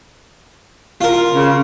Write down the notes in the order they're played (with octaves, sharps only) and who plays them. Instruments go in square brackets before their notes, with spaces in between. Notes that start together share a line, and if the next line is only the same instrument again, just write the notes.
[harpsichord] F4 A#4
[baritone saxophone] C#3